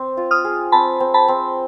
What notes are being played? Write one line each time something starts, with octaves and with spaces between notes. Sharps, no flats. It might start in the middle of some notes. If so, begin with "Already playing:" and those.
Already playing: C4
F4
D#6 F6
G#4
C4 A5 B5
C4
A5 B5
C4